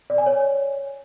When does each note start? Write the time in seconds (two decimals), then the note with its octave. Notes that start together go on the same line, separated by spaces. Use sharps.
0.10 D5
0.18 G#5
0.26 C#5